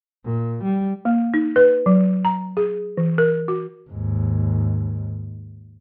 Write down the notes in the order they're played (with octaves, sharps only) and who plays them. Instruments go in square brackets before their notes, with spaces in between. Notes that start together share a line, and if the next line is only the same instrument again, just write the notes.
[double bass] A#2
G3
[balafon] A#3
D#4
B4
F#3
A#5
G#4
E3
A#4
F#4
[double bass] D#2 G#2